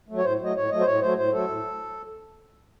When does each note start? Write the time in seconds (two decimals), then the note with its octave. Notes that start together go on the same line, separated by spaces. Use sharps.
0.09 F#3 A3
0.18 C#5
0.24 A2 C5
0.40 F#3 A3 D#5
0.55 A2 C#5
0.70 F#3 A3 D#5
0.80 C5
0.86 A2 C#5
1.02 F#3 A3 C5
1.17 A2 C5
1.32 F#3 A3 A4
1.48 A2